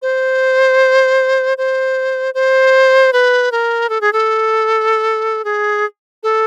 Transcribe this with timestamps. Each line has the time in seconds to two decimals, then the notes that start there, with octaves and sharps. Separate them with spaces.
0.02 C5
1.58 C5
2.34 C5
3.13 B4
3.52 A#4
3.89 A4
4.01 G#4
4.13 A4
5.44 G#4
6.23 A4